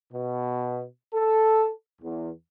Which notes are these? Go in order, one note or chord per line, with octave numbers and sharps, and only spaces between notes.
B2
A4
E2